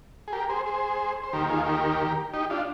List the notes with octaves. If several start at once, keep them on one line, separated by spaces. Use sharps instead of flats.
G#4
G4 A#4
G#4 C5
G#4 C5
C5
D#2 D#3 G4 A#4
F4 G#4
G4 A#4
D#4 G4
D4 F4